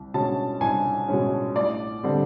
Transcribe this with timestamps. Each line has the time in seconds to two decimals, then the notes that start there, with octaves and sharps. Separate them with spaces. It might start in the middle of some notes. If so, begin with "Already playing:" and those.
Already playing: C2
0.14 B2 G#3 C#4 A5
0.61 C2 G#5
1.08 B2 G#3 C#4
1.56 A1 D5
2.03 D3 G3 C4